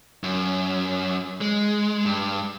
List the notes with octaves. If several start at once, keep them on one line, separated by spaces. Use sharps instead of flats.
F#2
G#3
G2